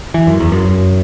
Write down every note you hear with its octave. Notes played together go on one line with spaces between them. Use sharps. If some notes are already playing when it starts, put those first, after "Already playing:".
E3
F#2
E2
F#2